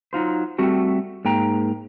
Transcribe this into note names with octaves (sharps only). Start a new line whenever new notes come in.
F#3 D#4 F4 C5
G3 A3 C4 F#4 G4
G#2 A#3 G5 A#5